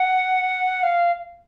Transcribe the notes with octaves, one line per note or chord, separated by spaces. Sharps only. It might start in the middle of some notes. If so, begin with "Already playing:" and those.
Already playing: F#5
F5